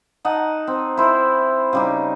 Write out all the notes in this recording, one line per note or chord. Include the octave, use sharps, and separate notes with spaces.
D#4 D#5 F#5 A5
C4
E4 C5
C#3 G3 D#4